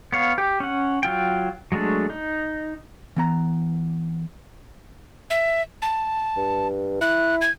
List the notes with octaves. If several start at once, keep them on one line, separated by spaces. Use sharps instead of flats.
B3 C#5 F5
G4
C#4 F#5
F#3 F4 G5
F#3 G#3 A3 D4
D#4
E3 B3 A#5
E5
A5
G2
E4 F#6
G#6